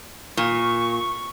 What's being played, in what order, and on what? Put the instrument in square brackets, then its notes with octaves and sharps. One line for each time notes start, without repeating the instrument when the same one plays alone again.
[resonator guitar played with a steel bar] A#2 [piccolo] C#6